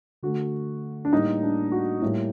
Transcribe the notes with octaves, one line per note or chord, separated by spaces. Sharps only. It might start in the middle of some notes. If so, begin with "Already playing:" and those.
D3 A3 F#4
D4
A2 G3 A#3 D#4
D4
F#4
A2 G3 A#3